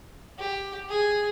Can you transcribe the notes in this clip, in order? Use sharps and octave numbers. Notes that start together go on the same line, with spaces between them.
G4
G#4